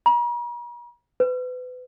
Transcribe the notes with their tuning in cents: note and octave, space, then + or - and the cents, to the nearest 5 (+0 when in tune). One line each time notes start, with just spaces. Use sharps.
A#5 +45
B4 +30